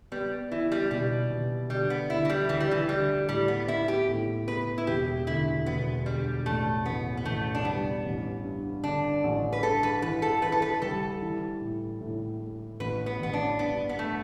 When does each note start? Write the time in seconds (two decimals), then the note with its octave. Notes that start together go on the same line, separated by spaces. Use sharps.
0.12 G3 B3
0.51 E3 E4
0.72 G3
0.91 B2 G3
1.31 B2
1.70 D3 G3
1.90 B3
2.10 D2 E4
2.25 E3
2.30 G3
2.49 D2 E3
2.61 G3
2.71 E3
2.89 D2 G3
3.28 A2 G3
3.48 B3
3.68 B3 E4
3.88 G4
4.08 A2
4.48 B3 B4
4.78 E4
4.87 E1 G4
5.27 D2 E4
5.66 E1 B3
6.06 D3 G3
6.45 A1 A3
6.85 A1 B3
7.17 B3
7.25 A1 A3
7.55 D4
7.65 G3 B3
8.04 A1
8.43 G2
8.83 D3 D4
9.24 A1
9.53 B4
9.63 G2 A4
9.83 B4
10.02 E3 B4
10.22 A4
10.42 E3 B4
10.52 A4
10.62 B4
10.82 G3 A4
11.21 E3
11.61 A2
12.01 A2
12.40 A3
12.80 A1 B4
13.06 B3
13.20 A1 B3
13.33 D4
13.59 G2 B3
13.89 B3
13.99 A3